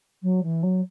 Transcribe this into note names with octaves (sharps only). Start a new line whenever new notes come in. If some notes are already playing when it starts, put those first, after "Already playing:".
F#3
E3
F#3